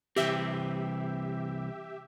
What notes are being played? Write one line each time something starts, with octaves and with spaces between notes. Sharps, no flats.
C2 E3 C4 G4 E5